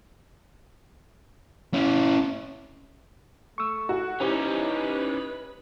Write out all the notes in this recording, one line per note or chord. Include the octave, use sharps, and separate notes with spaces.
C#4 E4
A3 C#6 E6
F#4
C#4 D#4 E4 G4 B4 C5